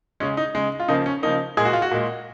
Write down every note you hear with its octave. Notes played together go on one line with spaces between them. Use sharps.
C#3 G#3 C#4
D#4
C#3 G#3
F4
C#3 F3 A#3 D#4
C#4
C#3 F3 A#3 D#4
A#2 G#3 G#4
F#4
F4
F#4
A#2 G#3